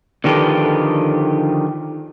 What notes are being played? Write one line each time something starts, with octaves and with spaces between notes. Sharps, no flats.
D3 D#3 F3 G4 A4 B4